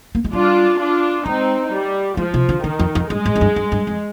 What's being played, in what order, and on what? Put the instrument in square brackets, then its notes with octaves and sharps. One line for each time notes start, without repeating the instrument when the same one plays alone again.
[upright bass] A#3
G#3
[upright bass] G3 [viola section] D4 F4
[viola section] D4 F4
[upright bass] G#3 [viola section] C4 D#4
[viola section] G3
[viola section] F3 [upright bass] G#3
[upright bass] C3
D3
[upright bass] D3 [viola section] D#3
[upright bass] F2
F2
[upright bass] G2 [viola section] G#3
[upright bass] G#2
F2
G2
G2
G2
F2